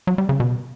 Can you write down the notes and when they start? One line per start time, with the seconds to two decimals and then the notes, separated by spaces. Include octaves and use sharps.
0.07 F#3
0.18 G3
0.29 C#3
0.40 B2